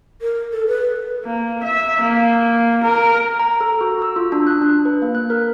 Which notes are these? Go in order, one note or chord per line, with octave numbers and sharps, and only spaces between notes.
A#4
A4
B4
A#3
E5
A#3
A#4
A#5
A4
F#4
E6
F4
D4
F#6
D4
B4
A#3
F#6
A#4